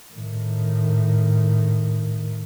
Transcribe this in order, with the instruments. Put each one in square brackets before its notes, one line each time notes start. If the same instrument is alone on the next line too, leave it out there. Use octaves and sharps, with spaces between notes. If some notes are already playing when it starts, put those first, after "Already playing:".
[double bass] A2 D#3